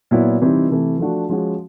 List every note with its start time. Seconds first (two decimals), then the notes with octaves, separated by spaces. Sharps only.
0.11 A#2 F#3 B3 E4
0.41 C3 E3 G3 C4 D#4
0.70 C3 E3 A3
0.99 F3 A3 D4 F#4
1.29 F3 G#3 C#4 F#4